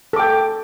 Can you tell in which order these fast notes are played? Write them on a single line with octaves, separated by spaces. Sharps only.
A4 D6 G5